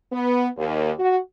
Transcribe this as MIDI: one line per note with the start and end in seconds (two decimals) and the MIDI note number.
0.12 0.48 59
0.57 0.92 39
0.99 1.19 66